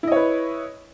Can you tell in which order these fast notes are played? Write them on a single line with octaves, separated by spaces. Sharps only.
E4 D#5 C#5 B4